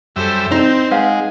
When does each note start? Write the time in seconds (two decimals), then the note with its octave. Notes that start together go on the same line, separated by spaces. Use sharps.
0.16 F#2 G3 A4 C5 E5
0.52 C4 D#4 C5
0.91 G#3 B4 F5 F#5